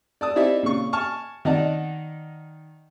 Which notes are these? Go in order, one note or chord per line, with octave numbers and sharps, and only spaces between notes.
D5 A5 D#6
C4 D#4 E4 G4 D5 E5
A#2 C#3 C#6
G#5 A5 C#6 F6
D#3 D#4 D5 F#5 A5